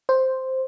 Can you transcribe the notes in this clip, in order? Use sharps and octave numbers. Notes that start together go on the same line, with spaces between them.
C5